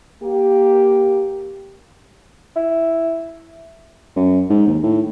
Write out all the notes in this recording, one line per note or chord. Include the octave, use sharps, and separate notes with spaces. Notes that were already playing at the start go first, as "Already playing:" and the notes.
A#3 G4
E4
F#2
G#2
D#2
A2